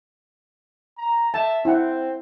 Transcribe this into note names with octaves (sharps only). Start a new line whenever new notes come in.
A#5
E5 A5
C4 E4 F#5